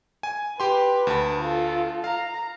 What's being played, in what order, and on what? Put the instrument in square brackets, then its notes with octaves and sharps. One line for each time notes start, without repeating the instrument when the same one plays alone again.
[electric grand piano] G#5
[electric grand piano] G4 C6 [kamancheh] B4
[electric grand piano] D2 A5
[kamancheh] F4 A4
[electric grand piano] F5 [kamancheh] A#5